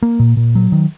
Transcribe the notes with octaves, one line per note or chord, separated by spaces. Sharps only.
A#3
A#2
A#2
F#3
D#3